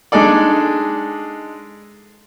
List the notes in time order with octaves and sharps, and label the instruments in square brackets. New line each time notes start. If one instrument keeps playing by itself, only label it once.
[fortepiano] G#3 D4 D#4 G#4 A4 D5